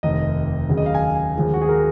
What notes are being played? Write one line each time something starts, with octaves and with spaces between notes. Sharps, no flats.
F1 D#2 D#3 D#5
D#2 C#3 F#3
D#5
F5
G#5
D#2 C#3 F3 G#3
F#4
G#4
A#4